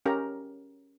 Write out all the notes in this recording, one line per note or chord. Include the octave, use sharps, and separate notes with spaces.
C#4 G4 A#4 A#5